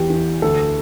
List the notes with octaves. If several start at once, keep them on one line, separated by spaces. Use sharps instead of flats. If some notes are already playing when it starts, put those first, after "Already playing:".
Already playing: E2 G4
E3
D2 A4